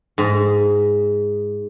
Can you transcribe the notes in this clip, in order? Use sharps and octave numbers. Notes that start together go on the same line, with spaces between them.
G#2